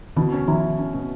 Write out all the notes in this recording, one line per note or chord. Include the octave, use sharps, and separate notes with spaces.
B2 D3 E3
C#4
D#3 F3 E4
E4
C#4
B2